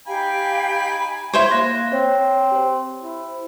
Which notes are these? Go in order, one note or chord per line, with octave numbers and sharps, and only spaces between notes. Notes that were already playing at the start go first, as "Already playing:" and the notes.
D#4 G4 F5 G5 G#5 B5
E4 C5 C#5
A#3 F#6 A#6
C4 C5 C#5
G4 C5
E4